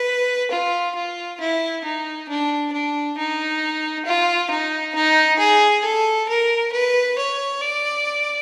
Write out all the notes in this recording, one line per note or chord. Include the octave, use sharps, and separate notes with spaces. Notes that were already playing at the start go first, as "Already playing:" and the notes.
Already playing: B4
F4
F4
E4
D#4
D4
D4
D#4
F4
D#4
D#4
G#4
A4
A#4
B4
C#5
D5